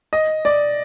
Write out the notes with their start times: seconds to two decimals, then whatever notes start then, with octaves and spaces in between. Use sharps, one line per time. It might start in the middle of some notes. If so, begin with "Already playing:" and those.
0.13 D#5
0.45 D5